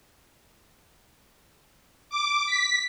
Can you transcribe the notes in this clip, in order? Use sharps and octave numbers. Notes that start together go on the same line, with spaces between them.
D6
B6